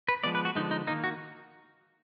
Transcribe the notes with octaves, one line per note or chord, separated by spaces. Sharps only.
B4
F3 G#3 B3 D5
B4
F#4
D3 F3 G#3 B3 D#4
D#4
D#3 A#3 D#4
F#4